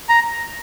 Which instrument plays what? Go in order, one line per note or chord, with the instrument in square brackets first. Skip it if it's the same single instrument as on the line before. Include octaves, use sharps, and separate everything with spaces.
[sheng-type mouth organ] A#5